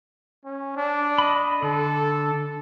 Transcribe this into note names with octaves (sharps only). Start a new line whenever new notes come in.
C#4
D4
D#5 B5
D3 A4